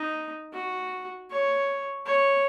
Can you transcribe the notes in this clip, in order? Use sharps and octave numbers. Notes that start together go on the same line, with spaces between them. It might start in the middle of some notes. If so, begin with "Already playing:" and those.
Already playing: D#4
F#4
C#5
C#5